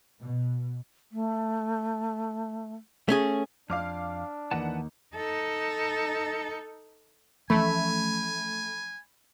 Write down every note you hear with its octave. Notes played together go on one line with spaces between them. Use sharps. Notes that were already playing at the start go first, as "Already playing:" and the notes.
B2
A3
A3 C#4 G#4
F2 D4 F5 D6 F6
D#2 E3 B4 F#5 A5
D#4 A4
E3 F3 A3 C#4 G#5 B5